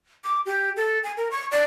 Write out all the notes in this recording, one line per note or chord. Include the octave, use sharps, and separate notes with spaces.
D6
G4
A4
G#5
A#4
C#6
D5